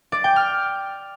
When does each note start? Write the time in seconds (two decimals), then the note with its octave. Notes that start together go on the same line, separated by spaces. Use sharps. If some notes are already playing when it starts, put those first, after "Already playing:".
0.12 D5
0.24 G5
0.36 F6